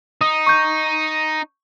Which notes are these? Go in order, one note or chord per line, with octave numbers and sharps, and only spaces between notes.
D#4 D#6
C#6 G6